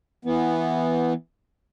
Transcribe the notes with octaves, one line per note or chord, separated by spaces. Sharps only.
E3 B3